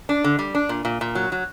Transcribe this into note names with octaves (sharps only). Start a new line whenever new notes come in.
D4
D3
G3
D4
A#2
A#2
A#2
F#3
F#3